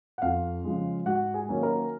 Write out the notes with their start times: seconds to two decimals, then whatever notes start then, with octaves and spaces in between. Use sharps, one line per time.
0.18 F#5
0.22 F2 F4 F5
0.64 C#3 F3 G#3
1.06 G#2 F#4 F#5
1.34 G#4 G#5
1.49 D#3 F#3 A#3 C#4
1.63 A#4 A#5